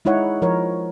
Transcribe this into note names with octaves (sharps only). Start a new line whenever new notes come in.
G#3 D#4 E4 C#5 F#5
F3 A#4 C#5